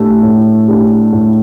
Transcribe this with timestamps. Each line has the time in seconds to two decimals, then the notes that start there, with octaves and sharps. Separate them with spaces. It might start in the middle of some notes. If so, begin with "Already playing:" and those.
Already playing: A2 A3 D4 G4
0.23 A2
0.68 A3 D4 G4
1.13 A2